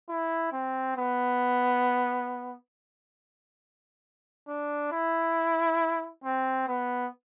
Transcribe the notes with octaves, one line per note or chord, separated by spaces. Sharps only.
E4
C4
B3
D4
E4
C4
B3